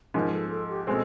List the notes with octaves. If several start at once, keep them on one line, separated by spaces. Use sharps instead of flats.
G#2 F3 G#3 A#4
A4
A4
G4
B2 G#3 C4 A4